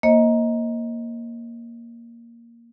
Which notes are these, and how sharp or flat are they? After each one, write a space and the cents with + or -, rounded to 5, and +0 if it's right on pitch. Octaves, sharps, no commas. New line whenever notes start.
A#3 +0 C5 +40 D#5 +20